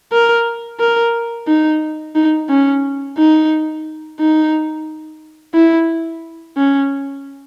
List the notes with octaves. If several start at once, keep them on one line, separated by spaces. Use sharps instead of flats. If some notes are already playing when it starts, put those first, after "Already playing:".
A#4
A#4
D#4
D#4
C#4
D#4
D#4
E4
C#4